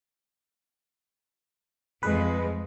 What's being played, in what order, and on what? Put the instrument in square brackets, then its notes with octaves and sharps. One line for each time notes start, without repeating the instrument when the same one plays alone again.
[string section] F2 [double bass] G#3 [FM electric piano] B4